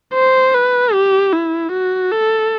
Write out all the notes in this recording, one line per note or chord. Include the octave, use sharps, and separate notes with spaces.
C5
B4
G4
E4
F#4
A4